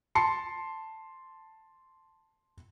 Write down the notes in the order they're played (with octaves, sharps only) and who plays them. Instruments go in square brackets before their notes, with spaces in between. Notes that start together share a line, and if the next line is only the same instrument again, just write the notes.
[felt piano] A5 C6 C7 C#7